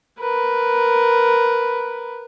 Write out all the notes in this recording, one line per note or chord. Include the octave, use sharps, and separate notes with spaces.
A#4 B4